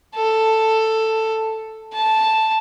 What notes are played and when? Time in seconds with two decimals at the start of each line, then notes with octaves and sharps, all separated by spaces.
0.15 A4
1.94 A5